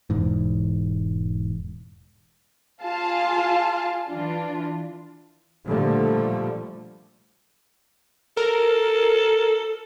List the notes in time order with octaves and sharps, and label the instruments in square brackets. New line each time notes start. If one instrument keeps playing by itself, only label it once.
[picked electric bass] E1 E2 G#2
[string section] F4 G#4 F5 A5
E3 D4 F4
[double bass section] A#2 D3 F3 G3 A3
[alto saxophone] A4 [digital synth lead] A#4